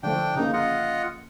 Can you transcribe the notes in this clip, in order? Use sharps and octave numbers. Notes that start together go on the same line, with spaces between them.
D3 F3 A3 D4 G5
C#3 A#3 D#4
F4 D#5 F#5